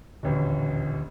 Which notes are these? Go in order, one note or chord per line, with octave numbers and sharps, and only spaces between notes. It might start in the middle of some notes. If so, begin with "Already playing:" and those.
D#1 A1 D2